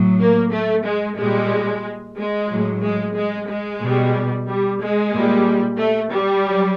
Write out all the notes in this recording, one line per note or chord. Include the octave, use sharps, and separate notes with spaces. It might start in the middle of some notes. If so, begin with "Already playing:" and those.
Already playing: A2 F#3
A#3
A3
G#3
A#2 G3 G#3
G#3
A2 F#3
G#3
G#3
G#3
B2 G3
G3
G#3
A#2 G3
A3
G3
F#3